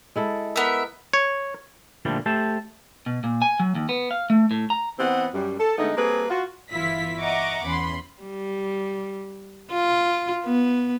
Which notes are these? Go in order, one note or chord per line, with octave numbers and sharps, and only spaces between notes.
G#3 E4 A4
B3 A#4 E5
C#5
A#2 D3 F3 G3 A3
A3 G4 C5 E5 A5
B2
A#2
G#5
F#3
D#2
B3
F5
A3
A2
A#5
E3 B3 C4 D#5 F#5
F#2 G3
A4
D3 G#3 A3 B3 D#4
G3 A#3 C4 G#4 A4 B4
F4 F#4
G1 E3 E4 F4 B6
D#5 E5 F#5 A#5 C#6 D6
E2 C#4 B5 C6
G3
F4
B3